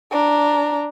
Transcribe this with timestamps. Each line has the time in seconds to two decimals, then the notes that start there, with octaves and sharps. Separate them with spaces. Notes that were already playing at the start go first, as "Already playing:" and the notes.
0.11 D4 A#5